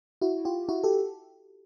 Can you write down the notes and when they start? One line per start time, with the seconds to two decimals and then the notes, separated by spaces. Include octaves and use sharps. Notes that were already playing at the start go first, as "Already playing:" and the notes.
0.22 E4 F#4
0.45 F4 G4
0.69 E4 F#4
0.84 G4 A4